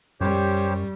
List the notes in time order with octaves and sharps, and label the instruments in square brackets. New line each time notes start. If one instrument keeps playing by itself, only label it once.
[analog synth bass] F#2 [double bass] G3 [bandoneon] G4 C5 C#5